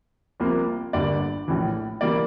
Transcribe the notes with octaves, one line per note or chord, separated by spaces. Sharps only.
C2 C3 F3 A#3
G1 G2 D3 G3 A#3 D5
A#1 A2 E3
E3 G3 A#3 D5